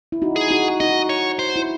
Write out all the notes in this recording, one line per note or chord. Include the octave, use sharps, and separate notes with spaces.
E4
D#4 F#4
G#4
D#4 F#4
D#4 F#4 D#5
C#5
C5
E4